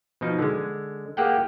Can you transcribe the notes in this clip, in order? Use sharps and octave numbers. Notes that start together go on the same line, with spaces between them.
B2 F3 D#4
D3 G#3
A#3 G4 G#4 F#5 G5